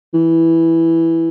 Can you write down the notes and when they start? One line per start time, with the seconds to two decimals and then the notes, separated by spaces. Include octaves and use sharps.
0.14 E3